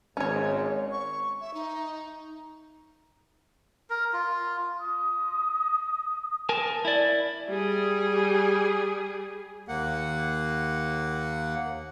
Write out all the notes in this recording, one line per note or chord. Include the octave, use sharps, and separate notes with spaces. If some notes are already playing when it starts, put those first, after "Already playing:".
G#1 G#2 C#4 C#5
C#6
E5
D#4
A#4
F4
D#6
A#4 G#5 A5
E4 D5
G3 G#4
D#2 A#3 F#5